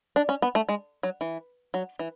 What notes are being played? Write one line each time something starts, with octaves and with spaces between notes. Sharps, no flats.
D4
C#4
B3
A3
G#3
F#3
E3
F#3
E3